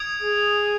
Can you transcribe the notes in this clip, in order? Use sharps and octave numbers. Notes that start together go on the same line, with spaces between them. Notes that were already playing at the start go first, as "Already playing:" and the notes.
Already playing: D#6 G#6 D7 F7
G#4